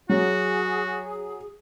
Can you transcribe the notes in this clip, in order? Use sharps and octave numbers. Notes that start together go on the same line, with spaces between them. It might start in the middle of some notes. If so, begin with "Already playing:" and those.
F#3 F#4 G#4